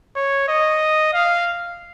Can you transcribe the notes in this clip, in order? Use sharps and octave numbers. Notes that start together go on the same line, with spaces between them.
C#5
D#5
F5